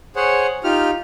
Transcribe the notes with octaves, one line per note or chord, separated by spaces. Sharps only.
G#4 C5 C#5 F#5
D#4 F4 G4 F6